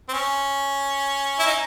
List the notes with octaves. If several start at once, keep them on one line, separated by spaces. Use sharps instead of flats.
C4
C#4
E4
D#4